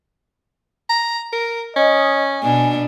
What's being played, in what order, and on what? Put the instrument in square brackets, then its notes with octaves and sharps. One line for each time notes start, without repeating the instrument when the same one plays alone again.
[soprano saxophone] A#5
A#4
[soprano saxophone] C#4 [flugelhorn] D#5
[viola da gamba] B2 D4 [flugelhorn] G#5